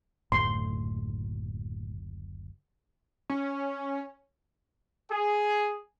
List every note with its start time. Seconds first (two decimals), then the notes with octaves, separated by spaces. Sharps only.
0.32 F#1 D2 A2 C6
3.30 C#4
5.10 G#4